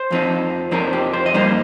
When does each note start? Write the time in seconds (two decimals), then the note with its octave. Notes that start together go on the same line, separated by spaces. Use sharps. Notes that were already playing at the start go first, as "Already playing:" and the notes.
Already playing: C5
0.11 F2 F3 C4 D#4
0.71 F2 F3 C4 D#4 A#4
0.93 G4
1.13 C5
1.26 D#5
1.34 G2 G3 A#3 D#4 C5